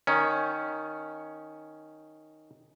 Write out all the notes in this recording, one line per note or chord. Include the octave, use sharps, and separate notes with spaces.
D#3 C#4